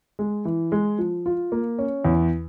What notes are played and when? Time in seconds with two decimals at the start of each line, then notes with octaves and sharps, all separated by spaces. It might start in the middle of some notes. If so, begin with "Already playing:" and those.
0.19 G#3
0.45 E3
0.72 G#3
0.99 F3
1.26 F4
1.52 A#3
1.79 C#4
2.05 E2